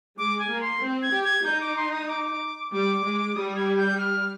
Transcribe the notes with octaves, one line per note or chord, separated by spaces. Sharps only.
G#3 D6
G#5
A#3
C6
C4
G#6
G4
G#6
D#4 G6
D6
C6
D#6
D6
G3 D6
G#3
G3 D#6
G#6
G6
F6